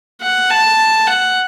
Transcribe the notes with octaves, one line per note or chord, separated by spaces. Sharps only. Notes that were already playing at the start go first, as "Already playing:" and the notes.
F#5
A5
F#5